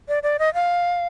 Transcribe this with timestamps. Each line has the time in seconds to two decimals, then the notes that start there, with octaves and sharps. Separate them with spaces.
0.08 D5
0.23 D5
0.39 D#5
0.54 F5